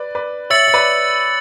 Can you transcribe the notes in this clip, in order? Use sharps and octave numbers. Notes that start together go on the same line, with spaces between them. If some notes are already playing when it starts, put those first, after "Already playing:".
Already playing: B4 D5
B4 D5
C#5 E5 E6 A6 C#7 F#7
E5
B4 D5